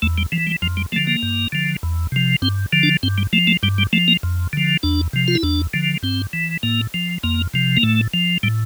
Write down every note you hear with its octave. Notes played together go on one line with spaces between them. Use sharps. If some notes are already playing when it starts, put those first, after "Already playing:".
E2 A3
G3
E3 F3
G3
F2 F3
G3
D3 F3 A3
A#3
G2
D3 F3
E2
C3 F3
G2 C4
D3 F3
D4
G2 C4
G3
F3 A3
A3
G2 G3
G3
F3 A3
A#3
F2
D3 F3
E2 D4
C3 F3
F4
E4
E2 D4
D3 F3
G2 C4
E3
A2 A#3
F3
F2 A#3
C3 F3
A#3
A2 A3
F3
A2 G3